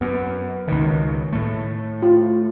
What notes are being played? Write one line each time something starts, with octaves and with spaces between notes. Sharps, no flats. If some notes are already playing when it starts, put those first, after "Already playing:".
F#2 B3
C#2 B2 D#3
A2 A3
F4